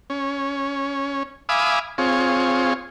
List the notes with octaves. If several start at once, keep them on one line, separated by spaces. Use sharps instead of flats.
C#4
E5 F5 G#5 B5 D6 D#6
C4 F4 G#4 C#5